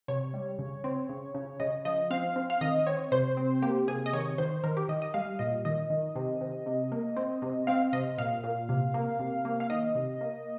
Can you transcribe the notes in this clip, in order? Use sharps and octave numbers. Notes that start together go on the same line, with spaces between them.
C3 C#5
G3
C#3
C4
C#3
C#3
C#3 D#5
F3 D#5
C4 F5
C4
F5
D#3 D#5
C4 C#5
C3 C5
C4
A#3 G4
C3 G#4
D#5
D#3 C#5
D#3 C5
D#3 A#4
G4
D#3 D#5
D#5
G3 F5
A#2 D#5
D#3 D#5
D#3
C3
C3
C3
A#3
C4
C3
C4 F5
C3 D#5
A#2 F5
A#2
C3
A#3
C3
A#3
F5
D#3 D#5
C3
A#3